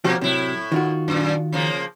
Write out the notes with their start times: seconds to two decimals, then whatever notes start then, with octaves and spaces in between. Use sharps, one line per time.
0.04 B2 F3 A#3 F#4 G4
0.21 A2 C3 F#3 E4
0.72 D#3 F4 F#4
1.08 F#2 A#2
1.52 C#3 F3 A#3